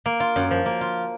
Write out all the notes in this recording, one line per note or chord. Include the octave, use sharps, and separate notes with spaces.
A#3
F4
F#2
F3
A#3
F4